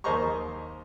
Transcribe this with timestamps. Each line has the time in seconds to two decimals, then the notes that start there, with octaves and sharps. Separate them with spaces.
0.04 D#2 A#4 C5 D#5 A#5 C#6